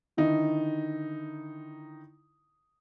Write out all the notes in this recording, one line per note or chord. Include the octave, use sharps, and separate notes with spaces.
D3 D#3 D#4 E4